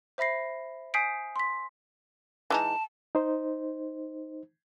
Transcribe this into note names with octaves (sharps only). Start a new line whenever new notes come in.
C5 E5 B5 A#6 C7
G#5 D#6 G6 B6 C7 D7
C6 B6
E3 G#3 D#4 A5
D#4 C5